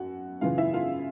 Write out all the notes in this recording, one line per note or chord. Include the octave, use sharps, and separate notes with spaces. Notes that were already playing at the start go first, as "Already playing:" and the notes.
Already playing: F#2 F#4 F#5
F#2 C#3 E3 F4 F5
E4 E5
F4 F5